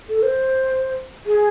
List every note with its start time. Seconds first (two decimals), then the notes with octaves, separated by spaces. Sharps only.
0.09 A4
0.23 C5
1.26 G#4